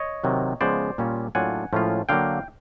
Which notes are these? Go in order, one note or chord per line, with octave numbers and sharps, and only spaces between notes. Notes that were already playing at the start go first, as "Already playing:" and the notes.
Already playing: C#5 D#5
C3 D#3 F#3
C#3 F3 G#3 B3 C5 D5
A#2 G3 A#3 C#4 F4
A2 F#3 A#3 D4 F4 F#5 G#5
A2 F3 G#3 C#4 F4
D3 F#3 A#3 F5 G5